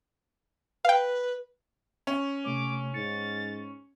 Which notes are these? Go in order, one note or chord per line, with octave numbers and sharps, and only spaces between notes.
B4 F5 G5
C#4
C3 A3 C#5 D6
G#2 A6 C#7